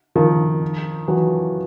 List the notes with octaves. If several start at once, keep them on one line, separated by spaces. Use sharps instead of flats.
D#3 F3
E3 F#3